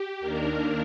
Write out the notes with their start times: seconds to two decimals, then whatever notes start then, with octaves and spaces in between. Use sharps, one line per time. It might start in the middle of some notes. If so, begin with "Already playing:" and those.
Already playing: G4
0.20 D#2 D#3 A#3 D4 A#4